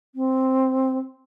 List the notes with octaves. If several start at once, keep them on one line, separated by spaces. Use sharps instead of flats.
C4